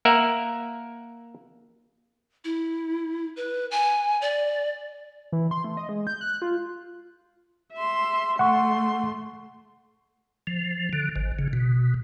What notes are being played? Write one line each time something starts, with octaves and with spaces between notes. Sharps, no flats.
A#3 A#4 E5 F#5
E4
B4
G#5
D5
E3
C6
A3
D#5
G#3
G6
F#6
F4
E5 C6
A3 F#5 C6 C#6
F3
D3
G#1
C#3
B2